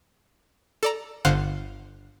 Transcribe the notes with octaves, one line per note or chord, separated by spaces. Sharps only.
A4 D5 A#5
G1 D3 C5 F5 F#5 F#6